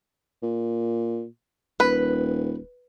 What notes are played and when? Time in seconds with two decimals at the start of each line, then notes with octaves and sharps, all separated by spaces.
0.43 A#2
1.80 D#1 B4